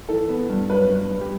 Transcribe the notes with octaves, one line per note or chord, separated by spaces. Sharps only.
E3 A4
B3
G2
F#3 B4
G2
G2
G4